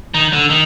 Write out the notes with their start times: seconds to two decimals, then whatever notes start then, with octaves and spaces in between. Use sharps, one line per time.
0.14 D#3
0.33 D3
0.50 D#3